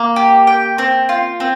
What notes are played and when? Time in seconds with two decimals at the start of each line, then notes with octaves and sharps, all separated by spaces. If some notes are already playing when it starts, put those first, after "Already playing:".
Already playing: A#3
0.16 G4
0.47 G5
0.78 C4
1.09 F4
1.40 C4